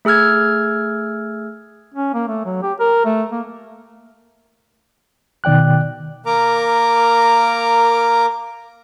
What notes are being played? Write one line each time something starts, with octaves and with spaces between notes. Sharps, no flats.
A3 G#4 E6 F6 G#6
C#4
A#3
A3
F#3
G4
A#4
A3
A#3
B2 D#3 D5 G5 F#6
A#3 A#4 A#5 D6